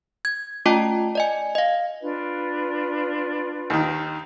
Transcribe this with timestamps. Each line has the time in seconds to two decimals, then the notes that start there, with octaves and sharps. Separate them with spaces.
0.25 G#6
0.66 A3 C#4 F4 D#5 G5 A5
1.15 D5 D#5 G#5
1.55 D#5 F5
2.00 D4 F4 B4
3.70 D#2 D#3